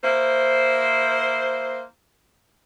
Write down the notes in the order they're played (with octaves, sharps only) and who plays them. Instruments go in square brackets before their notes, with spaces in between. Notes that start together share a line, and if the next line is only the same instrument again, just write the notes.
[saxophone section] A#3 E4 C5